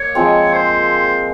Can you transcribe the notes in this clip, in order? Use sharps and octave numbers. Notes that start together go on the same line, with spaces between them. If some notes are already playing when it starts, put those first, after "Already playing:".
Already playing: A#3 C#5 D#5
F3 G#3 C4
C5